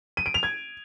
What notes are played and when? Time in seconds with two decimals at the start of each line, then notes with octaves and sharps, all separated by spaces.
0.17 D#7
0.26 D7
0.34 F7
0.43 G#6